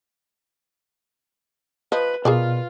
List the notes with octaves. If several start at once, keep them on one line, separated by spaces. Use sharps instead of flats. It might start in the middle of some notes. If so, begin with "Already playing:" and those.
F3 B4 D#5
B2 F4 G#4 A#4 D5